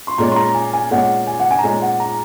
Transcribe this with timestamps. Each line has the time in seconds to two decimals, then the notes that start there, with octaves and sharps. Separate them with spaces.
0.07 C6
0.18 A#2 G#3 C#4 A#5
0.31 C6
0.36 A#5
0.54 G#5
0.73 G#5
0.91 A#2 G#3 C#4 F#5
1.27 G#5
1.39 F#5
1.51 G#5
1.59 A#5
1.63 A#2 G#3 C#4 G#5
1.82 F#5
2.00 A#5